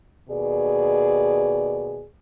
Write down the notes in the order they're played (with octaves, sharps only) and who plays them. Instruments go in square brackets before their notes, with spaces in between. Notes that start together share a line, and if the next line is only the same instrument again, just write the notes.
[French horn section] D#2 B2 G#4 D5